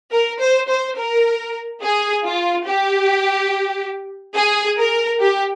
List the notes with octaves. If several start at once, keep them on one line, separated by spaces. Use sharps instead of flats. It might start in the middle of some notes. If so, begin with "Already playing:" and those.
A#4
C5
C5
A#4
G#4
F4
G4
G#4
A#4
G4